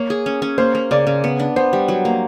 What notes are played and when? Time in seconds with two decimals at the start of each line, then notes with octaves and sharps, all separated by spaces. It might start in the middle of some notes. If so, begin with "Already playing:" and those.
Already playing: A#3 C#5
0.10 G#4
0.26 C#4
0.42 C#4
0.58 A#3 C5
0.75 A#3
0.91 C#3 D5
1.07 C#3
1.24 B3
1.40 D4
1.56 B3 C5
1.73 G3
1.88 F#3
2.05 A#3